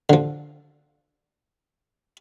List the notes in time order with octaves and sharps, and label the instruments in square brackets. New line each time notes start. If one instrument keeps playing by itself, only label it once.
[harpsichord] D3 F3